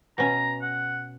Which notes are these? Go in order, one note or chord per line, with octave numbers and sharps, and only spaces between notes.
B2 C#4 A#5
F#5